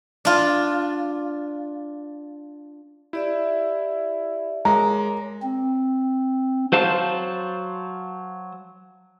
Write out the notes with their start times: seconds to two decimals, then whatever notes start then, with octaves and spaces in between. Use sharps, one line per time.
0.25 D4 F4
3.13 E4 G4 D5 E5
4.65 G#3 A#4 C#5 A#5 D6
5.43 C4
6.72 F#3 C5 F5 A5